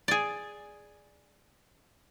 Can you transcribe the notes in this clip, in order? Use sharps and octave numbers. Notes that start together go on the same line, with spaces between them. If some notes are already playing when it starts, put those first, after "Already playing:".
G#4 D5